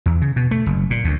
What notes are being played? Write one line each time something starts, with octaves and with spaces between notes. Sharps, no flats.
E2
C#3
B2
A3
F#1
A#2
D2